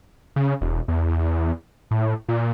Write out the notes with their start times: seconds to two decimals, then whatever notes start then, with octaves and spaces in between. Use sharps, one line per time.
0.36 C#3
0.61 E1
0.88 E2
1.91 A2
2.29 A#2